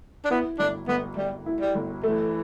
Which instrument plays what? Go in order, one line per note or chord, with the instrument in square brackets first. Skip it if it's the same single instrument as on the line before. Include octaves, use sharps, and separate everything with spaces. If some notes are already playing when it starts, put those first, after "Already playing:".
[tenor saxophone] D4
[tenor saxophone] B3 [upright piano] E4
[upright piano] G1 [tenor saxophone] D4
[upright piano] G1 [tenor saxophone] B3
[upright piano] G1 [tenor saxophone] G3
[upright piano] E4
[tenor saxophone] G3
[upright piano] G1
[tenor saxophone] E3 [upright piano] A3